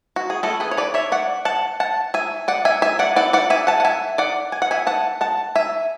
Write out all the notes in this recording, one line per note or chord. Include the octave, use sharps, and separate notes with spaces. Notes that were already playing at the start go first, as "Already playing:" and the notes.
F#4
G#4
A3 C#4 E4 F#4 A4
G#4 B4
C#5
B4 D5
C#5 E5
D5 F#5
F#5 A5
F#5 A5
E5 G#5
D5 F#5
E5 G#5
E5 G#5
D5 F#5
A3 E4 D5 F#5
D5 F#5
E5 G#5
F#5 A5
F#5
E5 G#5
D5 F#5
G#5
F#5
E5 G#5
F#5 A5
F#5 A5
E5 G#5